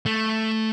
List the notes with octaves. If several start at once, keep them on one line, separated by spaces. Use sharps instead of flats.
A3